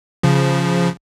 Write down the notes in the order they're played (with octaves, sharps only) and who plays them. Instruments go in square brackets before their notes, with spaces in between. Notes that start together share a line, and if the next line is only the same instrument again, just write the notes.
[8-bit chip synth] C#3 F3